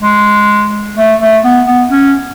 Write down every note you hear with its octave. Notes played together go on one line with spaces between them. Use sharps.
G#3
A3
A3
B3
B3
C#4